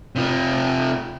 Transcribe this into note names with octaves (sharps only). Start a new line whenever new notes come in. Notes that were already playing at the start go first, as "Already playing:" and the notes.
C3 F4